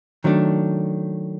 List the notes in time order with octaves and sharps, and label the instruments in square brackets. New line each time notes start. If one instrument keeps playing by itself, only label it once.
[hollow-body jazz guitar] D#3 F#3 A3 D4